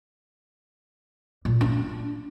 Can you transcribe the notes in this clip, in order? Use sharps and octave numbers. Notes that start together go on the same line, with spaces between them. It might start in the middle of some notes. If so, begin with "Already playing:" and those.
A#2
D4